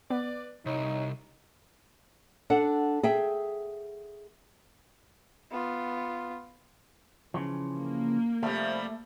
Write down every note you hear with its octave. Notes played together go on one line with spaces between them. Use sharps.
B3 B4 D5
C2 D#4 C#5
D4 A4 F#5
G#4 E5 G5
B3 F4
C#3 E3 F3
A#3
C3 F3 G3 A3